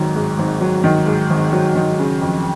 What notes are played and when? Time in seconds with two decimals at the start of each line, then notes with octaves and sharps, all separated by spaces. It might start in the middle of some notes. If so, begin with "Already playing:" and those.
Already playing: G#1 G#2 D#3 F#3
0.15 G#2
0.38 G#1
0.61 F#3
0.84 D#3
1.06 G#2
1.30 G#1
1.53 F#3
1.76 D#3
1.99 C#3
2.21 F2